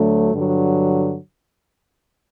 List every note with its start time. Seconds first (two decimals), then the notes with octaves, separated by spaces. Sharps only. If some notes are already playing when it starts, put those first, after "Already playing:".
Already playing: D2 D3 F#3 A3
0.33 G2 D3 F#3